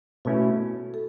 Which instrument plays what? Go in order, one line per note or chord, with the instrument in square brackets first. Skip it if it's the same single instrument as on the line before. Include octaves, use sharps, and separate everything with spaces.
[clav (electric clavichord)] B2 A3 C#4 E4 [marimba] F#4 A4
[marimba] A4